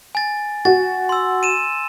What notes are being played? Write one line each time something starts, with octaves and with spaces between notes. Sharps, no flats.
G#5 A6
F#4 A6
C6 E6
D#7 E7